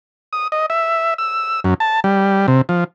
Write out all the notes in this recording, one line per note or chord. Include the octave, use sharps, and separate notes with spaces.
D#6
D#5
E5
E6
F#2
A5
G3
C3
F3